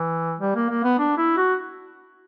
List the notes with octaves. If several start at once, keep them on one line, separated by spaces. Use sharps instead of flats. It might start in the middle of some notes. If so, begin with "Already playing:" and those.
Already playing: E3
G3
A#3
A#3
B3
D4
E4
F#4